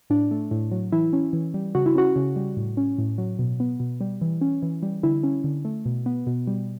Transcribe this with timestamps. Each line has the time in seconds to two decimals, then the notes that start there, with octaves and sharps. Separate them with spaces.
0.10 A2 D4
0.31 A3
0.51 A2
0.72 F#3
0.92 E3 E4
1.13 C#4
1.33 E3
1.54 G3
1.75 C#3 F#4
1.86 E4
1.95 C#4 F#4
2.16 C#3
2.36 G3
2.57 A2
2.77 C#4
2.98 A2
3.18 F#3
3.39 B2
3.60 B3
3.80 B2
4.01 G3
4.21 E3
4.41 C#4
4.63 E3
4.83 G3
5.03 D3 E4
5.24 C#4
5.44 D3
5.65 A3
5.86 B2
6.06 B3
6.27 B2
6.47 G3